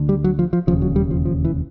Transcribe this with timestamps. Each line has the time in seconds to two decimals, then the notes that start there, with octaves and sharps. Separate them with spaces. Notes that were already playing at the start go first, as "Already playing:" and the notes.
Already playing: D2 D3
0.09 G3
0.24 F#3
0.39 F3
0.53 F3
0.67 E1 D#2 C#3 F3
0.82 F#3
0.96 G3
1.11 F3
1.25 F3
1.45 E3